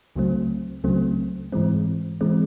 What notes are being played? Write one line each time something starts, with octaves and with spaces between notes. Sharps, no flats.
C#2 C#3 F#3 A3 C4
C#2 C#3 F#3 A3 C4
G#2 E3 G#3 C4
E3 G#3 C4